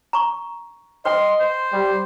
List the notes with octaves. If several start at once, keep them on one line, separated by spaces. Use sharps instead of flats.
A#5 C#6
B4 D#5 G5 C6
C5
G3